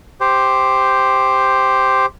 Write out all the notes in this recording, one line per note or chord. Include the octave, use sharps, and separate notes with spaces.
G4 C5